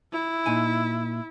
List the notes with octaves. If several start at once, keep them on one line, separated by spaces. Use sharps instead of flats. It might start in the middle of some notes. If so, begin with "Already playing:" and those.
E4
A#2 D#4 G#5